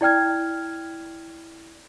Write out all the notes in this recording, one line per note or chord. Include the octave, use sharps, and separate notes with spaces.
E4 D5 G5 F6 G#6